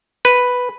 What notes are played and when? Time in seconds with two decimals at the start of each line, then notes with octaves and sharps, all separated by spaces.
0.25 B4